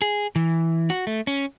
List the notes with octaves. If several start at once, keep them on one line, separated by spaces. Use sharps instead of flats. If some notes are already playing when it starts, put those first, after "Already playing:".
G#4
E3
F#4
A3
C#4